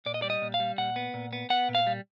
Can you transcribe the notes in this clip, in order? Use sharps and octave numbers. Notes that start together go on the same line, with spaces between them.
A#2 D5
D#5
G3 D5
D#5
A#2
F5
G3
A#2 F#5
B3
A#2
B3
B3 F#5
A#2
F5
G3